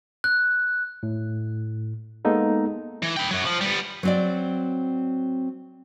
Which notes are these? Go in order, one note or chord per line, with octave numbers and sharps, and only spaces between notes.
F#6
A2
G#3 A#3 B3 D#4 A4
E3
B4 G5
F#2 F#3
F3
G3 B3
F#3 C4 D5